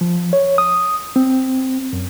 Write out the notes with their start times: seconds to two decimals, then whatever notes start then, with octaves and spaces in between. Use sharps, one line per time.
0.01 F3
0.33 C#5
0.58 D#6
1.16 C4
1.93 F#2